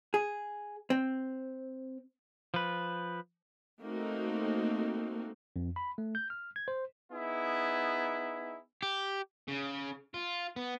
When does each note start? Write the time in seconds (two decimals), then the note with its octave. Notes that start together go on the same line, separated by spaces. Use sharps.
0.14 G#4
0.90 C4
2.54 F3 B4
3.81 A3 A#3 C4 D#4 F#4
5.56 F2
5.76 B5
5.98 A3
6.15 G6
6.30 F6
6.56 G#6
6.68 C5
7.12 B3 D#4 E4 G#4
8.83 G4
9.48 C#3
10.14 F4
10.56 B3